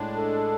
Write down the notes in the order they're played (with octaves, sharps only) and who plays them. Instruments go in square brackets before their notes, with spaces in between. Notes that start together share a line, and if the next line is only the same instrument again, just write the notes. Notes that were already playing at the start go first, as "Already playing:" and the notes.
Already playing: [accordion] A2 G#3 D4
[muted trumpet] A4